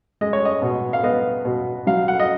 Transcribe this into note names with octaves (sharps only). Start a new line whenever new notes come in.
G#3 D#5
C#5
D#5
B2
F5
B3 D#5
B2
F#3 F5
F#5
D#5